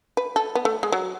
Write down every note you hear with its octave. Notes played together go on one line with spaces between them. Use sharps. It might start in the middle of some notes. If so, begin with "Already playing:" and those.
B4
A4
B3
A3
G#3
F#3